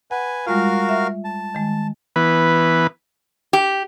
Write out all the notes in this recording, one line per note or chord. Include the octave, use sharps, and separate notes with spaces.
B4 F#5 G#5
G3 G#3 F4 F#4 A#4 F5
E5
A5
D#3 G#3
E3 B3 B4
G4